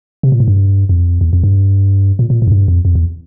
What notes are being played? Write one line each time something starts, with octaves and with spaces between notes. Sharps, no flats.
C3
A#2
A2
G2
F2
E2
F2
G2
A#2
A#2
A2
F2
G2
F2
F2
E2